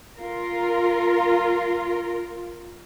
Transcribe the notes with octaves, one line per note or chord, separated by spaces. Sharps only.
F4 A#4